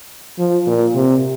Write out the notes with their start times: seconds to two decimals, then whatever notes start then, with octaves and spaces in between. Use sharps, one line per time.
0.39 F3
0.67 A#2
0.95 C3